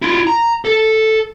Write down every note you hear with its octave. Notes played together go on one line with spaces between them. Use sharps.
E4 F4
A#5
A4